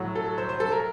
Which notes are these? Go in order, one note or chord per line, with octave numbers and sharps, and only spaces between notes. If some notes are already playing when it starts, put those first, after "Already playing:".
Already playing: A2 F#3
A4
C5
C5
A4
A#4